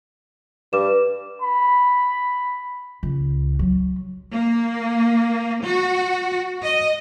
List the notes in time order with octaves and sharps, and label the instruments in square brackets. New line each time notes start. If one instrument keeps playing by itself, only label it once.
[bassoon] G2 [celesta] B4 D6 E7
[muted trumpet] B5
[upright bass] C#2
F#3
[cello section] A#3
F#4
D#5